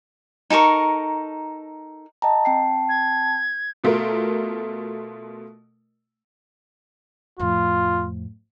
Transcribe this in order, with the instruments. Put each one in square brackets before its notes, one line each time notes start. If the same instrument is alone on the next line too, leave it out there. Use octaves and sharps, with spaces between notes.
[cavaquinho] D#4 A4 A#4 C#6
[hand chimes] D#5 G5 A#5 [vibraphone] A5
[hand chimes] C4 G5 C7
[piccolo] G#6
[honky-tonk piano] B2 A3 F4 A#4
[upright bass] F2 A2 [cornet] F4